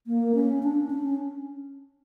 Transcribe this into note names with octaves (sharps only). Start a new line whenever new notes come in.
A#3
C#4
D4
C#4